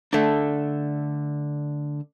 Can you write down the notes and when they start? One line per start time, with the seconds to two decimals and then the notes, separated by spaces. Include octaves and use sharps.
0.13 D3 A3 D4